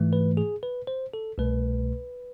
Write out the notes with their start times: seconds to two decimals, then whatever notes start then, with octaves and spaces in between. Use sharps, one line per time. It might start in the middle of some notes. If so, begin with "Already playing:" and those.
Already playing: G#2 E3 A3
0.13 B4
0.37 G#4
0.63 B4
0.87 C5
1.14 A4
1.38 C2 B2 A3 B4